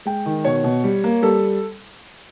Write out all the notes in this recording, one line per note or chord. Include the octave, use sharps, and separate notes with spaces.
G#3 G5
D#3
B2 C#5
B2
G3
A#3
G3 A4